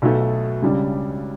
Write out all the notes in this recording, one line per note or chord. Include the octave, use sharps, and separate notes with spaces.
B1 B2 A3
C#2 C#3 G3 D4